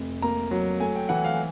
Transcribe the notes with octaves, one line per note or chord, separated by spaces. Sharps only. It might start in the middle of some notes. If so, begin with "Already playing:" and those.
Already playing: F1
A#3 A#5
F#3
A3 G#5
G5
E3 F#5
F5